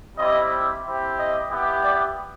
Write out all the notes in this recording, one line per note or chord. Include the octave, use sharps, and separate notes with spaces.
G3 C4 E4 G4 D#5
C4 E4 G4
D#5
B3 E4 G4
D5